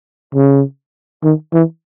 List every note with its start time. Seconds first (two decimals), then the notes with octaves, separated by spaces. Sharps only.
0.35 C#3
1.24 D#3
1.54 E3